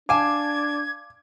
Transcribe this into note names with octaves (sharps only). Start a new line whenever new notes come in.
D4 F5 G#5 A5 D6 G#6